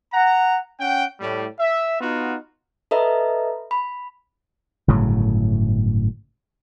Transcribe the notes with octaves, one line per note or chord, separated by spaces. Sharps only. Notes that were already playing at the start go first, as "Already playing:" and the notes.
F#5 A#5
C#4 F#5 G5
A2 G3
E5
B3 D#4 F4 F#4
A4 B4 D#5 E5 A#5
B5
G1 A2 C#3 F#3